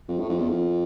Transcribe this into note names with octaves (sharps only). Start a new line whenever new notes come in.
F2
A2
F2
E2
F2